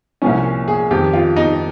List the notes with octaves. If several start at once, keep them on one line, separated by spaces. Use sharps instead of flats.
C2 A#2 F3 C#4
G#4
F2 D#3 G4
F4
D#4